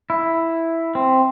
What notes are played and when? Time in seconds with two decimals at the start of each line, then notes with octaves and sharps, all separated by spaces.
0.10 E4
0.95 C4